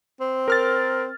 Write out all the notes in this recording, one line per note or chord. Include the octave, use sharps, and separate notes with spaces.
C4
A#4 F6 A6